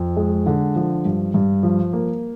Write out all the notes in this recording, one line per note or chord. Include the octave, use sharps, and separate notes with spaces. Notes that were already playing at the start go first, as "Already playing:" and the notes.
Already playing: F2
G#3
D3
F3
G2
G2
F3
A#3